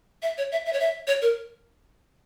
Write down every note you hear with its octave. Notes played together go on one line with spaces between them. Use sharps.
E5
C#5
E5
E5
C#5
E5
C#5
A#4